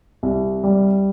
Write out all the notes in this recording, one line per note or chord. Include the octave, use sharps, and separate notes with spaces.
C2
G3